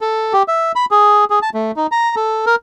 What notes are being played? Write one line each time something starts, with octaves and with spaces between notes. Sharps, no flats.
A4
G4
E5
B5
G#4
G#4
A5
A3
D#4
A#5
A4
A#4